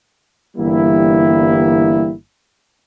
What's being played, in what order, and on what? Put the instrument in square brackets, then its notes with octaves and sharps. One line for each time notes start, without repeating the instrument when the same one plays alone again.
[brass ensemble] G1 E3 G3 A#3 E4